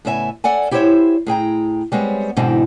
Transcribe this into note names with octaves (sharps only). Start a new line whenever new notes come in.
A2 C#3 B3 E5 F5 G#5
A4 D5 F#5 G#5
E4 G4 G#4 C5 C#5 E5
A2 G#4 G5 A#5
G3 G#3 B3 C4 C#5
G#2 B2 D3 E3 C4 D#4